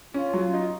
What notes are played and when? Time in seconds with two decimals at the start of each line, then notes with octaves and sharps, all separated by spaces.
0.14 C#4 F4
0.34 F#3
0.54 D#4